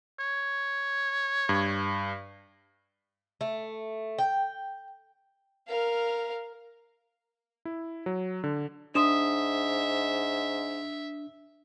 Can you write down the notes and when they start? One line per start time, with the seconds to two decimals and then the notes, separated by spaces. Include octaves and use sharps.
0.20 C#5
1.49 G2
3.41 A3
4.18 G5
5.68 A#4 F5
7.65 E4
8.06 F#3
8.44 D3
8.95 G#2 D4 E5 C6 D#6 E7